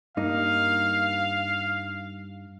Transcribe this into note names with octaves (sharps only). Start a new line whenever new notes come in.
G2 A#3 D#4 F5